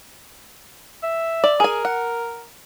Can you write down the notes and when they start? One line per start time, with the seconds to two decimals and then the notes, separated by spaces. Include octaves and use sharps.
1.03 E5
1.44 D5
1.60 G#4 A#4 G#5
1.85 F#5